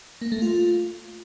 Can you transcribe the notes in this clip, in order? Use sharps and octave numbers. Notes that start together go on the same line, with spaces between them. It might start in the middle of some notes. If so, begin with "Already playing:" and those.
A#3
A3
F4